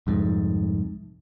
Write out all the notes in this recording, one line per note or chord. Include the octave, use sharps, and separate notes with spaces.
C2 F2 G#2